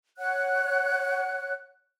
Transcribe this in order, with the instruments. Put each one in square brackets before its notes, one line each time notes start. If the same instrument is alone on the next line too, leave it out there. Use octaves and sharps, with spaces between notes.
[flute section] C#5 F#5 F#6